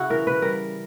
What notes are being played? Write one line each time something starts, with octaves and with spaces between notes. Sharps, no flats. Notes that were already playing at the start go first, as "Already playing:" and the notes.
Already playing: C#3 E4 F#4
E3 A#4
B4
G3 A#4